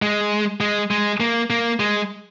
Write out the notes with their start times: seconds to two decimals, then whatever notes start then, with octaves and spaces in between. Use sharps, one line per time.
0.02 G#3
0.61 G#3
0.91 G#3
1.20 A#3
1.50 A#3
1.80 G#3